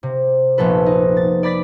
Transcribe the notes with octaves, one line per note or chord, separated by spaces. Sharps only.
C3
F1 A#1 B3 A4 B4
D#4
A6
D5 B5 A6 B6